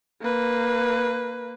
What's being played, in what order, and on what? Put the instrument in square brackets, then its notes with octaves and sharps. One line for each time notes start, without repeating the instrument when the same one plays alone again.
[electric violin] A#3 B4